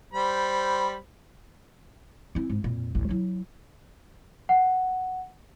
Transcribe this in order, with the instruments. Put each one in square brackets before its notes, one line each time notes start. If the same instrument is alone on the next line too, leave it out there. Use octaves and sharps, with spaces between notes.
[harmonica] G3 C5 B5
[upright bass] C4 E4
G#2
F2 A#2
A1 D2
F#3 E4
[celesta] F#5